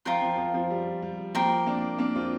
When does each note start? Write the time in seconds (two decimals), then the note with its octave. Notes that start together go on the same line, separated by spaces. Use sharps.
0.05 F3 F4 A#4 G5 C6
0.22 F3
0.38 F3
0.54 F3
0.70 G3
1.02 G3
1.35 F3 A#3 A#4 G5 C6
1.66 A#3 D4
1.99 A#3 D4
2.15 C4 F4